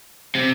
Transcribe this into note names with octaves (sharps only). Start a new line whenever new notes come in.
C3